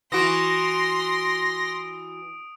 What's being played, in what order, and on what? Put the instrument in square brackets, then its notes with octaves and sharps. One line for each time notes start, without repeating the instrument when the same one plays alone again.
[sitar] E3 F#4 [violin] C6 [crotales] D#6 D7 [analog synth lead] A#6